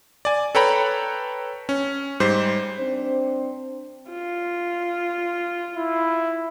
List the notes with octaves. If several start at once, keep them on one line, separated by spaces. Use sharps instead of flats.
D5 G#5
A4 B4 C#5 G5 A#5 B5
C#4
G#2 G3 C5
C4 D4 C5
F4
E4